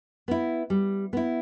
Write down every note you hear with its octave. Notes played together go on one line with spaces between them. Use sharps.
B3 E4
G3
B3 E4